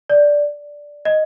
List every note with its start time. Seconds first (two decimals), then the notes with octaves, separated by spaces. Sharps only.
0.09 D5
1.05 D#5